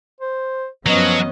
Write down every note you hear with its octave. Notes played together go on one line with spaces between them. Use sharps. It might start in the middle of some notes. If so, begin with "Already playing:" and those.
C5
F#2 F3 F#3 B3 C#4 D#5